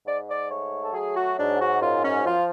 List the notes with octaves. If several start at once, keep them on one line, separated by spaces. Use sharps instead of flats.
G#2 D5
D5
A3 C#5
A4
F#3 G#4
F#4
G#2 D4
F#4
F#2 F4
C#4
F3 F4